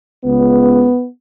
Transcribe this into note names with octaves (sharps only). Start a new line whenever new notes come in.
C#2 C#3 B3